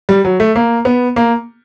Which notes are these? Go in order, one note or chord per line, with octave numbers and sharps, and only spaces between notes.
G3
F#3
A3
A#3
B3
A#3